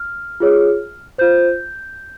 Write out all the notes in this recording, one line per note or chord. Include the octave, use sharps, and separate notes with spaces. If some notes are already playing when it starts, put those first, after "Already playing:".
Already playing: F6
F4 G#4 C#5
F4 C5 G6